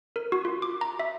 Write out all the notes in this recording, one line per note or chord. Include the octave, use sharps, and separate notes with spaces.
A#4
F#4
F4
D6
A#5
E5